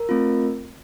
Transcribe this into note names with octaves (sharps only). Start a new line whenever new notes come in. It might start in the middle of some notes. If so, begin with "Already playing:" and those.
Already playing: A#4
A3 C4 F4